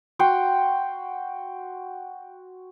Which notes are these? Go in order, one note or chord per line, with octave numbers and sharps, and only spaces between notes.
F#4 F#5 G5 C6